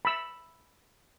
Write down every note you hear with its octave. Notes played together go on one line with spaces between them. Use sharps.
B5 E6